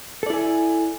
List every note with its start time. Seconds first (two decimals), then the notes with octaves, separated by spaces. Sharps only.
0.23 A4
0.26 D5
0.30 E4
0.33 G#5